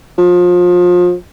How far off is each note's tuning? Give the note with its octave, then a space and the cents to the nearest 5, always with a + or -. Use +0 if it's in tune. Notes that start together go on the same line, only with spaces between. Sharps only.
F3 +30